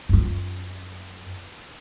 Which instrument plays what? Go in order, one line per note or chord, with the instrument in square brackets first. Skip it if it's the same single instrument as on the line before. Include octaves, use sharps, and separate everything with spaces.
[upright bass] F#2 F4